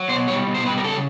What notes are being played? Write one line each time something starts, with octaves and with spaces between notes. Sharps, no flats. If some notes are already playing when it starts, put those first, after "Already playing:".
Already playing: F#3
B2 C5
G3 C#5
B2
C5
G3 B4
A#4
C#3 A4